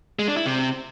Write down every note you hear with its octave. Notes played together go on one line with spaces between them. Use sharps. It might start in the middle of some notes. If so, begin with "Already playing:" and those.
G#3
D4
E4
C3